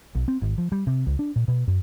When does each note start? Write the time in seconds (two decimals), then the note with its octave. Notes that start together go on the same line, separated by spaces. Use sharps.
0.15 B1
0.28 C4
0.42 G#1
0.58 F3
0.72 G3
0.87 C3
1.07 C#2
1.19 D4
1.36 A#2
1.48 B2
1.67 F#2